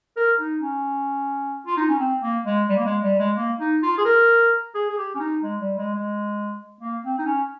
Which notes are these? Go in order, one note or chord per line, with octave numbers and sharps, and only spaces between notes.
A#4
D#4
C#4
F4
D#4
C#4
C4
A#3
G#3
G3
A#3
G#3
G3
G#3
A#3
D#4
F4
G#4
A#4
G#4
G#4
G4
C#4
D#4
G#3
G3
G#3
G#3
A#3
C4
D#4
C#4